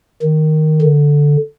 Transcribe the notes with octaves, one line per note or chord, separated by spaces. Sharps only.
D#3
D3